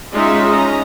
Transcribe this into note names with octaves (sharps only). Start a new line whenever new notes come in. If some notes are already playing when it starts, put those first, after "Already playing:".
G#3 C#4 D#4 F4 G#4 E5
C#4 D#5 A#5